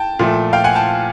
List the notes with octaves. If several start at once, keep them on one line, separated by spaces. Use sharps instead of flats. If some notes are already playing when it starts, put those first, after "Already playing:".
Already playing: G5 A5
A#2 F3 A3
F5 G5
F#5 G#5
G5 A5